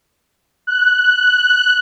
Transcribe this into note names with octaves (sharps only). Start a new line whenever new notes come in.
F#6